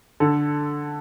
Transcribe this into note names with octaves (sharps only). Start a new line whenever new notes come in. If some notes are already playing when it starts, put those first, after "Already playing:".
D3 A4